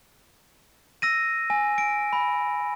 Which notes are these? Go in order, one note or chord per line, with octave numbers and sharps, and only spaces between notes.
E6 A#6 D#7
G#5
D7
B5